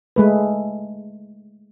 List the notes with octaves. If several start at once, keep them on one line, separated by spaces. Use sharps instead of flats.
G#3 A3 B4